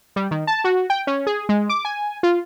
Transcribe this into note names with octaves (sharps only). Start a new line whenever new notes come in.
G3
D#3
A5
F#4
G5
C#4
G#4
G#3
D6
G#5
F4